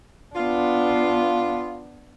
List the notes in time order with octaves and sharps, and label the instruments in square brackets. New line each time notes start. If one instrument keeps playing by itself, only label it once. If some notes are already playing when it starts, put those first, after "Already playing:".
[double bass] B3 D4 [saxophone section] F4